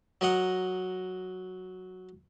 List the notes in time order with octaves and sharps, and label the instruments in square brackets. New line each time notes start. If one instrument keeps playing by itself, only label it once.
[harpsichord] F#3 A#4 D#5 F#5